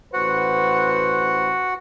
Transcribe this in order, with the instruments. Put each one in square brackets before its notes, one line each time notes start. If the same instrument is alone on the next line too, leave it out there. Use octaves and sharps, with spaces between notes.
[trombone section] A1 B4 C5 [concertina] F#4 F#5